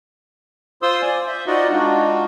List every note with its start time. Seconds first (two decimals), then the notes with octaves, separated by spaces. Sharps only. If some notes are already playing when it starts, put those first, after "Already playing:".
0.82 F4 C5 C6 D#6 E6
1.02 D5 G#5
1.27 C5 E5
1.47 D#4 F4 F#4 D5 D#5 F#5
1.72 G#3 D4 D#4 F4 F#4